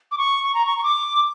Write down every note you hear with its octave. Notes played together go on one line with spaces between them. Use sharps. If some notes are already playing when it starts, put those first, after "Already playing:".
D6
C#6
C#6
A#5
C#6
C#6
D6